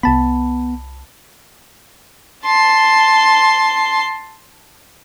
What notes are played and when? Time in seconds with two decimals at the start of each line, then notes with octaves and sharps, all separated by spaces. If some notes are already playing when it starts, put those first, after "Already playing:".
0.03 C2 B3 A5 B5
2.45 A5 C6